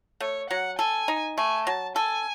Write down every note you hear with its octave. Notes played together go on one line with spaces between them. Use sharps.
A3 C#5
F#3 F#5
A4 G#5
D#4
A3 G#5
F#3 A5
A4 G#5